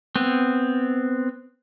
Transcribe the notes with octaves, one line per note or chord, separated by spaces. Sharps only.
B3 C4